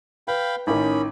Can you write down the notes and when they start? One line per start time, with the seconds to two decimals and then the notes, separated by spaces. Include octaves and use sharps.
0.28 B4 F5 G5 B5
0.67 A1 D#3 C#4 B5